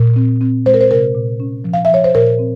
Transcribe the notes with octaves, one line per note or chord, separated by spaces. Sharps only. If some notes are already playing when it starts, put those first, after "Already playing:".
Already playing: A#2
C4
C4
G#3 C5
A#4
C5
C3 A#4
A#2
C#4
F3
F5
E5
F3 C#5
C5
A#2 A#4
C4